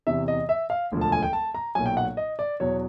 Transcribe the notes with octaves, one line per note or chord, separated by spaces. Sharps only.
E2 C3 E3 E5
D#5
E5
F5
E1 D2 D3 F3
A5
G#5
G5
A5
A#5
B1 A#2 F#3 G#5
G5
F#5
D#5
D5
E2 B2 F#3 C#5